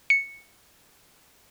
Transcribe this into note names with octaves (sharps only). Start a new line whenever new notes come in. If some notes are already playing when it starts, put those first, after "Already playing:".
C#7